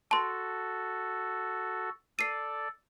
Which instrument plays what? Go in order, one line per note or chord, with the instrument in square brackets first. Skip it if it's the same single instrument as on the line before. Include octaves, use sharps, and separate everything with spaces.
[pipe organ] F#4 A4 [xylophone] A5 C6
[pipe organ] A4 D5 [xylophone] C7 D#7